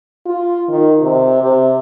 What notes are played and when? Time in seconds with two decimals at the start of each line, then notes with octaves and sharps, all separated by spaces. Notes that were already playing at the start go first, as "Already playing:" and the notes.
0.26 F4
0.69 D#3
1.02 C3
1.42 C3